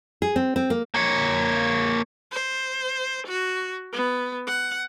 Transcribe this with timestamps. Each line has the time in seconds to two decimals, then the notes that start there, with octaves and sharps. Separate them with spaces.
0.22 G#4
0.36 C4
0.56 C4
0.70 A#3
0.94 A#3 C#5
2.32 C5
3.27 F#4
3.93 B3
4.46 F#5